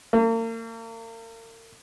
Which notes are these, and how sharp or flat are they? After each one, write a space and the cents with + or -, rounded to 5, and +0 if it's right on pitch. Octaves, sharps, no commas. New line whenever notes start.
A#3 -40